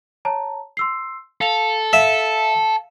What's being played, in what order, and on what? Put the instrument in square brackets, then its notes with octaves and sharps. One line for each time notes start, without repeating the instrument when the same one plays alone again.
[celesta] C#5 A5 A#5
C6 E6 C7
[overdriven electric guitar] A4 [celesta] F5 F7
[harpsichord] E5 [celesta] F5